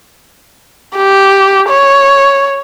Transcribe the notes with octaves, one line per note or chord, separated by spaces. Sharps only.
G4
C#5